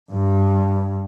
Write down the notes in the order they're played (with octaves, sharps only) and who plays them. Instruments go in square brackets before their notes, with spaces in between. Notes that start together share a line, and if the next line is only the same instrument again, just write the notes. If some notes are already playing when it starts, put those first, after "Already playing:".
[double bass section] G2